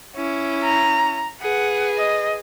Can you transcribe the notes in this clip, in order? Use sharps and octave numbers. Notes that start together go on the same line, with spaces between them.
C#4 E4
A#5
G#4 B4 F#5
D#5